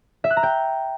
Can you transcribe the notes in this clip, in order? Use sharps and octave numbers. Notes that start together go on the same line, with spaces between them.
E5
F#6
A#5
G5